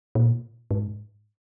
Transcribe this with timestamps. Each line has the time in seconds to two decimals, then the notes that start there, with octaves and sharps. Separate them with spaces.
0.15 A#2
0.71 G#2